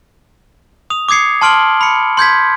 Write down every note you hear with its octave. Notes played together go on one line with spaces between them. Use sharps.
D#6 F7
D6 D#6 G#6 C7 C#7
A5 C6 F6 D7 F#7 G7
B5 C#7
C6 G6 G#6 B6